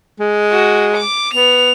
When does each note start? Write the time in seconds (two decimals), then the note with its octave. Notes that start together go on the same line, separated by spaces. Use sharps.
0.20 G#3
0.52 F#4
0.97 D6
1.34 B3 F7